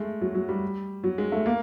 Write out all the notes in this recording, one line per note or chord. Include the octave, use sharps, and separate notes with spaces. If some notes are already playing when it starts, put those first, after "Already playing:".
Already playing: G#3 A3
F#3
F#3
G3
F#3
G#3
A3
A#3